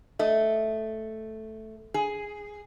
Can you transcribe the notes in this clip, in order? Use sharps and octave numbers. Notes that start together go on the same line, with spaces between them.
A3 D#5
G#4